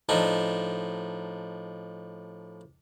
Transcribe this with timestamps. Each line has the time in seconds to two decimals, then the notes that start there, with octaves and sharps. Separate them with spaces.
0.09 A2 F3 D4 D#4